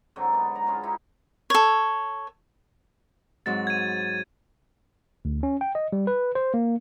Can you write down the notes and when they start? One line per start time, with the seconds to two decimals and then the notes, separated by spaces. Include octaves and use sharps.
0.16 G#2 D3 F#3 C4
0.33 B3 D5
0.55 D5 A#5 B5
0.67 G#3 C#4 F4
0.83 D#4 E4 G4
1.50 A4 C#5
3.46 G#2 F#3 C4 A6
3.67 G#6 D#7
5.25 D2
5.43 C#4
5.61 G5
5.75 D#5
5.93 G3
6.07 B4
6.35 C5
6.54 A#3